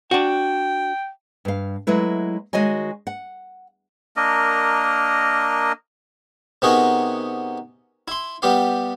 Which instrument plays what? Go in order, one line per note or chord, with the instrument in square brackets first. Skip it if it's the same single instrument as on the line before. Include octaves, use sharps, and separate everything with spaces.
[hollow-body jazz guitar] D4 F#4 [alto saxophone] G5
[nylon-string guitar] G2 F5
F#3 G#3 A3 E4 B4
D#3 G#3 F#4 C#5 D#5 G#5
F#5
[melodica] A#3 D4 A#4 D#5
[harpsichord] C3 B3 D#4 F#4 G#4 A#4
E4 C6
G3 B3 G4 F5